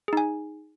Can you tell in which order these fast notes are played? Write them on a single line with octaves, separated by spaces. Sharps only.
G#4 D#4 G#5